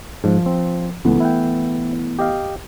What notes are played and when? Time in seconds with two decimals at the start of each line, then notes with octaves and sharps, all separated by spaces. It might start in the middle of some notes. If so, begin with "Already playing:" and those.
0.24 G#2 F3
0.46 C4
1.05 C#2 E3 A3 B3
1.20 E4 F#5 G5
2.19 G4 D#5 F5